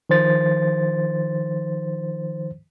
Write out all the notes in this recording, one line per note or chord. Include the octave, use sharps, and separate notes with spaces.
D#3 F3 C5 A6